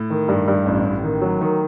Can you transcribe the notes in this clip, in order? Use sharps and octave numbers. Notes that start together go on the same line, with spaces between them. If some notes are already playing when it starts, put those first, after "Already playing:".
Already playing: A2
D#3
G2
G2
A1
A1
D#3
F#3
D#3